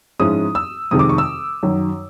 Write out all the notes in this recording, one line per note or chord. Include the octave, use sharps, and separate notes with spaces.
G#2 F3 G#3 C#4 E4 D#6
E6
F2 C3 D#3 G#3 D#6
D6
C#6
E6
F#2 D#3 F#3